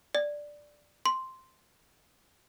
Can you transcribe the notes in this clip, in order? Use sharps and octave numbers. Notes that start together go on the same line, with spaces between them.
D5
C6